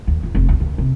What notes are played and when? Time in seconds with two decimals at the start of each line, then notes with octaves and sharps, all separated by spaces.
0.07 D#2
0.23 F2
0.35 F1
0.49 D2
0.60 D#2
0.78 C3